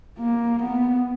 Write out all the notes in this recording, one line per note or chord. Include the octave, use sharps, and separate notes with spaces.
A#3
B3